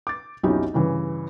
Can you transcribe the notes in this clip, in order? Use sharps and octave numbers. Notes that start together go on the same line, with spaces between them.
D6 A6
B1 F2 C#4 D#4 E4 G4
G2 C#3 E3